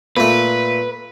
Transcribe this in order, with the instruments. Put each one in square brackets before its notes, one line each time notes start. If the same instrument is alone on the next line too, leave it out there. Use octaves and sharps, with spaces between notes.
[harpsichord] A#2 A3 [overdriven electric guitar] B4